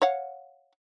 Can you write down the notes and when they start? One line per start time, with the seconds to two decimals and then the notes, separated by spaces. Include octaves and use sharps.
0.02 C#5 F5 F#5